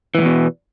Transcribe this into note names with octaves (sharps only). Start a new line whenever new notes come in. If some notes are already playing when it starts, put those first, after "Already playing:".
E2 G#2 B2 E3